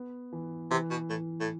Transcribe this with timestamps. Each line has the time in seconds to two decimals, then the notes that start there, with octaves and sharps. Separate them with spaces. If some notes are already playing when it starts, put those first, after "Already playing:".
Already playing: B3
0.33 E3
0.71 C3 E3
0.90 B2
1.10 A2 E3
1.40 A2